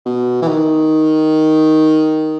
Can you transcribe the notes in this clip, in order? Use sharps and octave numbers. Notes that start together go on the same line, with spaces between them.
B2
E3
D#3